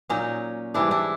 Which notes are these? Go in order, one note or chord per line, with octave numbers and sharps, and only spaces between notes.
A#2 F#3 C#4 D#4
G#2 E3 G3 D4 E4
D4 E4